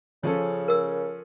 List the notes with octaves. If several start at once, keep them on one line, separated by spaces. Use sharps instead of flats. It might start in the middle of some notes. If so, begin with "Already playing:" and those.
C#3 F3 C#4 A4
A#4 E6